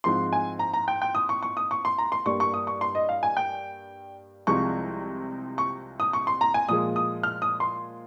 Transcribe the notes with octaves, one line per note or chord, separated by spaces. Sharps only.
G#2 F3 G#3 C4 C6
G#5
A#5
A#5
G5
G5
D#6
C#6
C#6
D#6
C#6
C6
A#5
C6
G2 G3 A#3 C#6
C#6
D#6
C#6
C6
D#5
F5
G#5
G5
C2 C3 F3 G#3 C#6
C#6
D#6
C#6
C6
A#5
G#5
A#2 F3 G#3 D#6
D#6
F6
D#6
C6